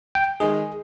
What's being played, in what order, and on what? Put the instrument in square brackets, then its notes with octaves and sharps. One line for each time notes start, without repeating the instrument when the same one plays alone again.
[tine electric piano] G5
[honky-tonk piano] D#3 G#3 D#4 [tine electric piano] G#4